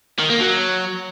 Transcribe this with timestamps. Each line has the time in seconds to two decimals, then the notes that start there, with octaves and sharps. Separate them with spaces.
0.19 D#3
0.30 A#3
0.40 F#3